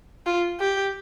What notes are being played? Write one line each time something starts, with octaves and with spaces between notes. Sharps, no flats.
F4
G4